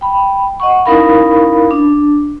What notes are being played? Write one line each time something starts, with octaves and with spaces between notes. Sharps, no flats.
G5 B5
D#5 F#5 C#6
C#4 D#4 E4 A#4 F5 B5
D4